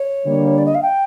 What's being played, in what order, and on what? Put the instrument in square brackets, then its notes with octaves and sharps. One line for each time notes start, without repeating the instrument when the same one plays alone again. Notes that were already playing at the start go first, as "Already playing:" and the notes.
Already playing: [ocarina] C#5
[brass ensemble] D3 G3 A#3
[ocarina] D5
D#5
F5
G5